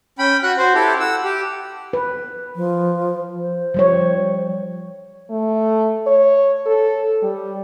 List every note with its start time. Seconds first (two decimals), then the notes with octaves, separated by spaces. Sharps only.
0.19 C#4 G5 B5
0.43 F#4 F#5 F#6
0.57 F#4 C5
0.74 E4 G4 A4
1.00 F#5 E6
1.25 G4
1.93 B4
2.56 F3
3.39 C5
3.74 F3 G3 C#5
5.30 A3
6.07 C#5
6.66 A4
7.22 G3